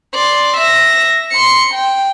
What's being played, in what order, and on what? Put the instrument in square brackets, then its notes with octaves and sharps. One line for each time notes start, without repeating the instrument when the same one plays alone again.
[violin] D5 C6
E5 A#6
C6 C#7
G5